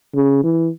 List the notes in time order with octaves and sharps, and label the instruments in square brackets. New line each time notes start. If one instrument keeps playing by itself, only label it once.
[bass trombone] C#3
E3